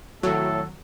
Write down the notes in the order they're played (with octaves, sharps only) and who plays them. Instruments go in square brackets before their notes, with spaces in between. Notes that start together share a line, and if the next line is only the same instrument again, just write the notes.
[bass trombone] A2 [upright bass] D#3 C4 [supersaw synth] F#3 [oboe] A4